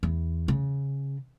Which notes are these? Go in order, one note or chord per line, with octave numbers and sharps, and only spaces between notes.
E2
C#3